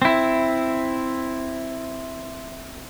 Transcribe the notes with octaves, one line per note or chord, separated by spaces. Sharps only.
C4 E4